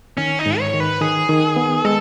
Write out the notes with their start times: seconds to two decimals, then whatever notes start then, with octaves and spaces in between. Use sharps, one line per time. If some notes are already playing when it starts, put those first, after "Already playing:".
0.17 D#3 C#4
0.39 D#4
0.46 G#2
0.59 C#5
0.74 D#3
0.80 B4
1.01 D#3 G#4
1.29 D#3
1.56 B3
1.85 G#3 A4